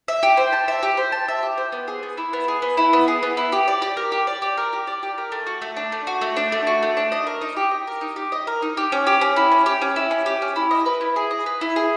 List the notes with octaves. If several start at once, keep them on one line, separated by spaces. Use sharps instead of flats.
E5
G4
C5
A5
E5
G4
C5
A5
E5
G4
C5
B3
G#4
B3
E4
B3
G#4
B3
E4
B3
G#4
B3
E4
G4
D5
G4
A#4
G4
D5
G4
A#4
G4
D5
G4
A#4
A3
F#4
A3
D4
A3
F#4
A3
D4
A3
F#4
A3
D4
D#5
A#4
D#4
G4
D#5
A#4
D#4
G4
D#5
A#4
D#4
G4
C#4
G4
C#4
E4
C#4
G4
C#4
E4
C#4
G4
C#4
E4
D#5
B4
E4
G#4
D#5
B4
E4
G#4